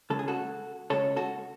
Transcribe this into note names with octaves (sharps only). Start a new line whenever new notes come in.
C#2 C#3 G#3 A4
G#4
F#4 A4
C#2 C#3 G#3 A4 C#5
F#4 A4